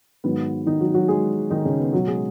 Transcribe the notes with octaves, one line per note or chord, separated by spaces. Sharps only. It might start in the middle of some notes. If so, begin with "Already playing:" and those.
G#2 D#3 F#3 B3
D#3 D#4
F#3 F#4
F#3 F#4
G#3 G#4
D#3 D#4
C#3 C#4
B3
B2 F#3 F#4
G#3 G#4